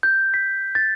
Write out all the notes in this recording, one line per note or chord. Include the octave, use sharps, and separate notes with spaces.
G6
B6
A6